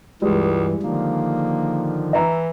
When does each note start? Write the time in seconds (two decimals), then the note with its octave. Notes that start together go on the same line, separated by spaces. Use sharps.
0.22 C#2 G2 E3 G3 G#3
0.83 D3 D#3 F3 A#3
2.13 E3 E5 A#5